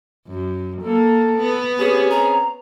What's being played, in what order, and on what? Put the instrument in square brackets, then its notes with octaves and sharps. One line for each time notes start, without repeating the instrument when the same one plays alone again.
[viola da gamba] F#2
[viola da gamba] A#3 [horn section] A4
[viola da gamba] B3
[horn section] C4 C#4 G#4 [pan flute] G4
[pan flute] A#5